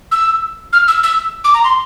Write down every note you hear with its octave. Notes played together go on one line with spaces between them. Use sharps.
E6
F6
E6
E6
D6
A#5
C6